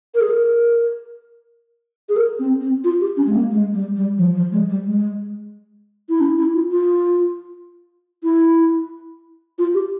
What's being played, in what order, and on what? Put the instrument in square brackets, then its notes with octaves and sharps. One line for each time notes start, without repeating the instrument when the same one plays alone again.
[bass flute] A#4
G#4
A#4
G#4
A#4
C4
C4
F4
G4
C#4
G#3
A#3
G#3
G3
G3
F3
F3
G#3
G3
G#3
E4
C#4
E4
F4
F4
E4
F4
G4